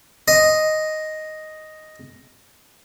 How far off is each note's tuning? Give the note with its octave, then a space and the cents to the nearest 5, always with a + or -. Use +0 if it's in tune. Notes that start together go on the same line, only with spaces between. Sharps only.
D#5 +0 C6 +0